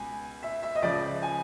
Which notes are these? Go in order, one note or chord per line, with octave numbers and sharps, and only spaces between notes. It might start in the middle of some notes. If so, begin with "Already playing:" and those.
Already playing: C#2 B2 G#5
E5
E5
D#5
C#2 C#3 F3 D5
G#5